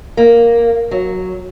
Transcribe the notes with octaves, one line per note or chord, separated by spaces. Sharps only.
A#3
F#3